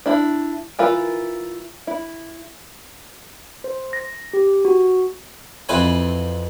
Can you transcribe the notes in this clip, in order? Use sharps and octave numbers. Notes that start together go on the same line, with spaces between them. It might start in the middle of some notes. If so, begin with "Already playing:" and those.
D4 E4
E3 E4 F4 A#4
E4
C5
A#6
G4
F#4
F2 E3 C4 B4 G#5